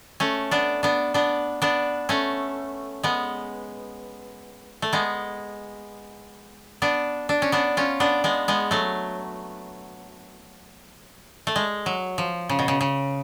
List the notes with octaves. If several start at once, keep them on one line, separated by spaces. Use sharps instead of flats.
A3 C#4
B3 D4
B3 D4
B3 D4
B3 D4
A3 C#4
G#3 B3
A3
G#3 B3
B3 D4
D4
C#4
B3 D4
C#4 F4
B3 D4
G#3 B3
G#3 B3
F#3 A3
A3
G#3
F#3
F3
C#3
B2
C#3
C#3